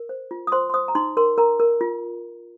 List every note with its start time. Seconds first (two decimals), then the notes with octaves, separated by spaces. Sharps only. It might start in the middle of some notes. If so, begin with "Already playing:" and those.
Already playing: A#4
0.09 C5
0.31 F4
0.47 D#6
0.52 C5 C6
0.70 C6
0.74 C5 D#6
0.88 A#5
0.95 D#4 C6
1.17 A#4 C6
1.38 A#4 A#5
1.60 A#4
1.81 F4